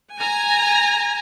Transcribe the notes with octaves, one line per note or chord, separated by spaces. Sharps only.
G#5 A#5